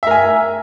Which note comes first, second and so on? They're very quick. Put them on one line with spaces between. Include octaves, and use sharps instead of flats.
E5 A#4 G#5